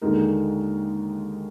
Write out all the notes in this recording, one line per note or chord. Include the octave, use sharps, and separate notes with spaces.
D#2 D3 G#3 D#4 A#4